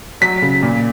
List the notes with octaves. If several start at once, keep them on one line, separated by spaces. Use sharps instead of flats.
F#3 B6
C#3
A#2